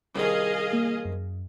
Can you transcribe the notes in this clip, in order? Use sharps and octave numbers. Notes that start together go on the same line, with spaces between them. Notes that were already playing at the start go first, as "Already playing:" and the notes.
C2 D#3 G#4 D#5 F5
A#3
F#2